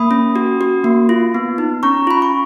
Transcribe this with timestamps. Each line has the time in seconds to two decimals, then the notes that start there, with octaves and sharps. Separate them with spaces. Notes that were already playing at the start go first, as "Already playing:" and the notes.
Already playing: A#3 B5 D#6
0.11 C#4
0.36 F#4
0.61 F#4
0.84 A#3
1.09 F4
1.35 B3
1.58 D#4
1.83 C#4 A#5 C#6
2.07 F4 B5
2.22 C#6